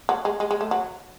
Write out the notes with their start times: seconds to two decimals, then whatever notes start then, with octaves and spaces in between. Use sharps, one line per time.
0.09 F#3
0.25 G#3
0.40 G#3
0.51 G#3
0.61 A3
0.71 F#3